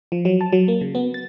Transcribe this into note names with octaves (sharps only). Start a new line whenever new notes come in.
F3
F#3
A5
F#3
A#3
C#3
B3
A6